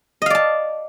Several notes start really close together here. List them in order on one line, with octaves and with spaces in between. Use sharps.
D#5 F5 D5 A5